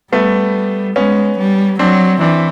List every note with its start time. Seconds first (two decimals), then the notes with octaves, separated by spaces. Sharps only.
0.12 G3 A3 B3
0.96 G#3 B3 C#4
1.38 G3
1.79 F#3 C4 D4
2.21 E3 C4 D4